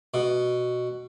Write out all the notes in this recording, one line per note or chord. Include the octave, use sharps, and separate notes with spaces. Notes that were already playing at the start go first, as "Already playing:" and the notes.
B2